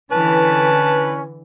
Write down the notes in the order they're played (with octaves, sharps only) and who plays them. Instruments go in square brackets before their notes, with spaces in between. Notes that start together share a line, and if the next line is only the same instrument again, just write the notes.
[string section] D3 E3 [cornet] C#4 [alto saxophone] B4 [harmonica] A5